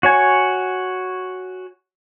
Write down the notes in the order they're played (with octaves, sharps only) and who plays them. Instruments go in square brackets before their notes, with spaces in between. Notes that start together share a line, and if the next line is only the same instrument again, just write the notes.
[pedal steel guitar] F#4 C#5 G#5